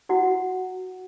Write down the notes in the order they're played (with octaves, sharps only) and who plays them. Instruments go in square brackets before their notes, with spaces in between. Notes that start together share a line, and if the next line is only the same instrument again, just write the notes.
[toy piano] E4 F#4 F#5